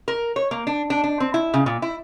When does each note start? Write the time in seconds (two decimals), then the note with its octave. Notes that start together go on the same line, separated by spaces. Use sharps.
0.08 A#4
0.36 C#5
0.51 A#3
0.67 D4
0.90 D4
1.04 D4
1.20 C4
1.34 E4
1.54 C#3
1.66 A#2
1.82 E4